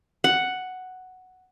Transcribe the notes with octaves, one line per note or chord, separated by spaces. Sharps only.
F#5